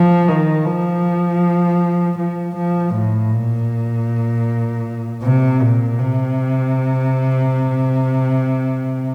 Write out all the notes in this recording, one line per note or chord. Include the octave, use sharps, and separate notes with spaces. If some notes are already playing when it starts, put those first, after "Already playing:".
Already playing: F3
D#3
F3
F3
F3
A2
A#2
C3
A#2
C3